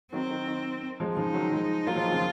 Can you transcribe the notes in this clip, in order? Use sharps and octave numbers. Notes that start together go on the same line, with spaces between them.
D#3 F#3 C4
D#3
D#3
F3 G#3
C#3 F3 D#4
D#3 F#3
F3 G#3
F#3 A#3 F4
F3 G#3
D#3
C#3 F3